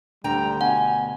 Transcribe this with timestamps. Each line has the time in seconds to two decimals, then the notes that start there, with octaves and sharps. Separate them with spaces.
0.24 D2 D3 G3 G5 A#5
0.61 B2 F#5 G#5